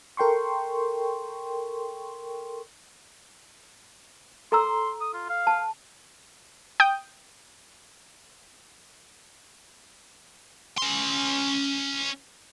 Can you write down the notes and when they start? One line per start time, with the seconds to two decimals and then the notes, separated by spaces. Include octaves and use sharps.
0.17 A4 A#4 G5 C6 C#6
4.52 A4 A#5 C6 E6
5.01 D#6
5.14 F4
5.29 F5
5.47 A5
6.80 G5 D#6 G6
10.78 C#4 C6